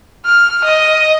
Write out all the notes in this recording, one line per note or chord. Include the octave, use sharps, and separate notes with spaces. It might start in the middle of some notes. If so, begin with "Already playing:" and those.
F6
D#5